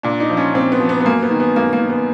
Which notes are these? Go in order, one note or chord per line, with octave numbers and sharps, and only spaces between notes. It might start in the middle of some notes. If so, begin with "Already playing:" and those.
A#2 D4
D#4
F3
C#4
A#2 C4
B3
F3
B3
B3
F#2 A#3
B3
D#3
B3
F#2 A#3
A#3
D#3
B3